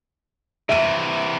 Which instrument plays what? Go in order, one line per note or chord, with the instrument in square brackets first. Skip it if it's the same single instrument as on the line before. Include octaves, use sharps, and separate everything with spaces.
[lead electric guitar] C3 E3 [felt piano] E5 D#7